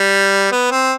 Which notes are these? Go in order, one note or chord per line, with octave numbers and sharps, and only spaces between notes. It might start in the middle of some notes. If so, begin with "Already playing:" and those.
Already playing: G3
B3
C4